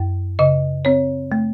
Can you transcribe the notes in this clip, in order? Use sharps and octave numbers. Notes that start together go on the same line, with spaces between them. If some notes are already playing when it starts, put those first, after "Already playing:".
Already playing: F#2
C#3 D#5
C4 C#5
A3